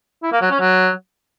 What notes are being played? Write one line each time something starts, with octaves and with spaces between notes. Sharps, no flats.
E4
A#3
F#3
C#4
F#3